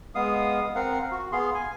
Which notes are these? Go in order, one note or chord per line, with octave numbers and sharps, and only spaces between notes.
G#3 B3 F5 D#6
C4 A#4 F5 F#5
F#4
B3 G#4 F5 C6
G#5